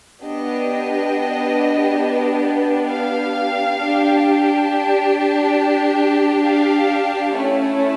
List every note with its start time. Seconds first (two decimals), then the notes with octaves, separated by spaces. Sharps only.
0.22 B3 D4 G4 D#5
2.88 F5
3.77 D4 G4
6.43 F5
7.32 A3 C#4 E4